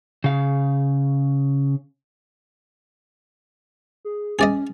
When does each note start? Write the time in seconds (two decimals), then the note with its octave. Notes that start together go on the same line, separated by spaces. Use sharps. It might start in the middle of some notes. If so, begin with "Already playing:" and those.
0.24 C#3 F5
4.05 G#4
4.39 C#4 G#4 D5 D#5